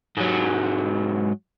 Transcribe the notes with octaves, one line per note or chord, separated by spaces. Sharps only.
G#2 F#3